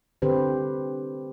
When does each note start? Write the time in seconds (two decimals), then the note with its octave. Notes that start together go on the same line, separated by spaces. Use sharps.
0.22 D3 C4 G4 B4 C5